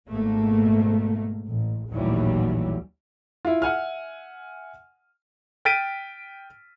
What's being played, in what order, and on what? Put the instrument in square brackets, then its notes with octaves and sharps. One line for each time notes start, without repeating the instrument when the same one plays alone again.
[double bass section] G#1 G#2 B2 A3 A#3
A1
A1 D#2 A#2 E3 F#3 G3
[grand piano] E4 F4
E5 F#5 G#5 F6
[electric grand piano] G5 F6 A6 B6 D7 D#7